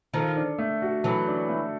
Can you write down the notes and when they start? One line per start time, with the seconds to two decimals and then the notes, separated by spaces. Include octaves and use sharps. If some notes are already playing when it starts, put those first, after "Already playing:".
0.14 D#3 F3 A4
0.36 D4
0.58 A3
0.82 F#4
1.04 E3 F#3 A4
1.27 D4
1.49 A3